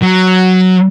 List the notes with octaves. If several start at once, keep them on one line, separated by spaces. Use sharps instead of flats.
F#3